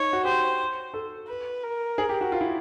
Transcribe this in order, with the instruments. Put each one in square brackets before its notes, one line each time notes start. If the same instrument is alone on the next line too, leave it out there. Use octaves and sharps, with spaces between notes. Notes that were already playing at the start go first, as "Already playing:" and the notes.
Already playing: [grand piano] D#4 [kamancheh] C#5
[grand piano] F#4
[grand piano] G4 [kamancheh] C5
[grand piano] A4
[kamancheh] B4
A#4
[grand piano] G#4
G4
F#4
F4
E4